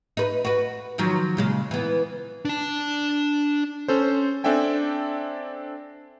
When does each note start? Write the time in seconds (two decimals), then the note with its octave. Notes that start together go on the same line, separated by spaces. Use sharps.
0.17 D#4 B4
0.45 F#4 B4
0.98 D#3 F3 F#3
1.37 A#2 C#3 G#3
1.71 E3 B3
2.45 D4 A5
3.88 C#4 A4 C5
4.44 C4 D4 A4 E5 G5 G#5